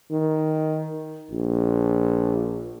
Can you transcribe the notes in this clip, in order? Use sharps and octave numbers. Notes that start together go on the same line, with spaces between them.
D#3
A#1